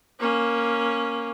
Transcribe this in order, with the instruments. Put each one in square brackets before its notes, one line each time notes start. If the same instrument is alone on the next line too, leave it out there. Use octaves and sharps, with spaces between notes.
[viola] A#3 C#4